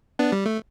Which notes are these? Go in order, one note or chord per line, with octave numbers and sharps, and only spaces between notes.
B3 D4
G3
A3